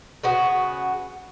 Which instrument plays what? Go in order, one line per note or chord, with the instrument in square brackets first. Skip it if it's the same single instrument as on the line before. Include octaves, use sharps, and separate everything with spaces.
[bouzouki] C#3 B3 F#4